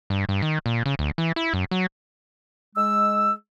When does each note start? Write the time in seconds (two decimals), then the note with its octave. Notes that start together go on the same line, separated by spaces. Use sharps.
0.10 G2
0.29 G2
0.42 D#3
0.66 A#2
0.86 C#3
0.99 D2
1.18 E3
1.36 E4
1.54 F#2
1.71 F#3
2.76 G#3 E6